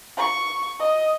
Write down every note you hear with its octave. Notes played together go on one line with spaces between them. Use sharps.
C#6
D#5